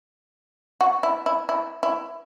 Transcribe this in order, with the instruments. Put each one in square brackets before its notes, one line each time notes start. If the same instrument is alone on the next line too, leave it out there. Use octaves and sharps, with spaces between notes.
[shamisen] F#4
E4
E4
E4
E4